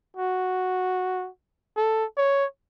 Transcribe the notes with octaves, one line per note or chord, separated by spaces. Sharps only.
F#4
A4
C#5